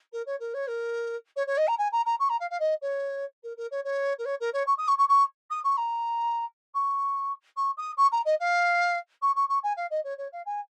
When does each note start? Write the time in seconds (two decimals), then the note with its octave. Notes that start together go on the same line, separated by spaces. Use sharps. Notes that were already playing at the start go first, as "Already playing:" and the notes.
0.12 A#4
0.26 C#5
0.39 A#4
0.54 C#5
0.67 A#4
1.36 C#5
1.47 C#5
1.57 D#5
1.67 A#5
1.78 G#5
1.92 A#5
2.05 A#5
2.19 C#6
2.29 A#5
2.40 F5
2.50 F5
2.60 D#5
2.82 C#5
3.43 A#4
3.57 A#4
3.71 C#5
3.84 C#5
4.18 A#4
4.25 C#5
4.40 A#4
4.53 C#5
4.66 C#6
4.78 D#6
4.88 C#6
4.98 C#6
5.09 C#6
5.50 D#6
5.64 C#6
5.77 A#5
6.74 C#6
7.56 C#6
7.77 D#6
7.97 C#6
8.12 A#5
8.25 D#5
8.40 F5
9.22 C#6
9.36 C#6
9.49 C#6
9.63 G#5
9.76 F5
9.90 D#5
10.04 C#5
10.18 C#5
10.32 F5
10.46 G#5